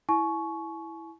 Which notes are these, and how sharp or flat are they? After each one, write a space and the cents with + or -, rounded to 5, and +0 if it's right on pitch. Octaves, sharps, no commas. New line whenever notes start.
E4 +0 G#5 +40 C#6 +5